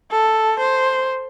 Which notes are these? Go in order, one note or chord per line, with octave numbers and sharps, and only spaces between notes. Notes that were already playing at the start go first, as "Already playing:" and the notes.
A4
C5